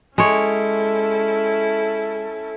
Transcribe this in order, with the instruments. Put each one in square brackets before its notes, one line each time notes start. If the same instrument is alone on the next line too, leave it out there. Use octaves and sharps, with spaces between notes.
[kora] G#3 C#5 [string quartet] C#4 E4 A4